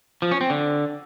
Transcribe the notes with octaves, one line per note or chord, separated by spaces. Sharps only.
F3
C#4
C4
D3